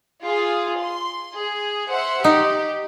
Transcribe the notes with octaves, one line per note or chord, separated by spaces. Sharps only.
F4 G#4
C6
G#4
C5 E5 F#5
D#4 G4